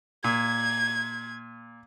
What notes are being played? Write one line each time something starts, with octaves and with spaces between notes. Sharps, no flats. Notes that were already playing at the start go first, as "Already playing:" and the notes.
A#2 G#6